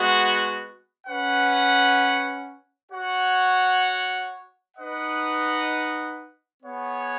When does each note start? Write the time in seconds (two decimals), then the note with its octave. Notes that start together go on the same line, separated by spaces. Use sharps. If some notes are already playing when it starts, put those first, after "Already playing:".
Already playing: G#3 B3 F#4
1.07 C#4 B4 F#5
2.92 F#4 C#5 F#5
4.77 D#4 B4 D#5 F#5
6.63 B3 G#4 C#5 F#5